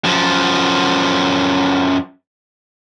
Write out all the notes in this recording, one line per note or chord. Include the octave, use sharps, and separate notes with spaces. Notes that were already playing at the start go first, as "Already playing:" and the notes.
F#2 F3